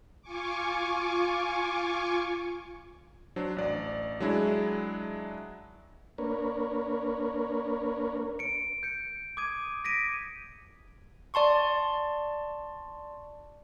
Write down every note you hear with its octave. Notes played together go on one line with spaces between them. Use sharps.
F4 G#5 C#6 D6
F#3 D4 C5
A1 D5
F#3 G#3 D4 E4 G#4
A#3 D4 A#4 B4 C#5
C#7 D7
G6 C#7
D6 D#6 G#6 D#7
A#6 B6 D7 D#7
D5 A5 C6 C#6